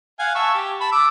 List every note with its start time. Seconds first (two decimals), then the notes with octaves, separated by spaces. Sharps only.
0.19 F5 F#5 G#5
0.35 E5 A5 C#6
0.54 G4
0.81 A5 B5
0.92 D6 E6